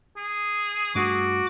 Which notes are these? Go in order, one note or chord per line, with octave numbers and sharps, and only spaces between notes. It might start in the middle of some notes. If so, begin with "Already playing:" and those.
G#4
G2 A3 D4 F#4 D6